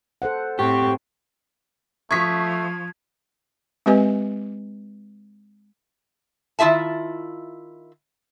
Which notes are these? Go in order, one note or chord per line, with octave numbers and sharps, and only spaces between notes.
A4 C5 F#5
A2 C4 G4 C#6
F3 A3 C#6 D#6 G#6 B6
G#3 C4 G4 B4 D#5 G#5
D#3 E4 F4 G4 E5 A5